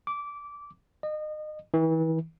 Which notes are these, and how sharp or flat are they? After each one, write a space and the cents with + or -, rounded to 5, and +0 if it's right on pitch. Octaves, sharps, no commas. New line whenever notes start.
D6 -15
D#5 -30
E3 -35